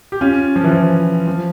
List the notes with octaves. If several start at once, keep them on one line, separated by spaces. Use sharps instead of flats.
G4
C#4 F4
F3
E3
F3
F3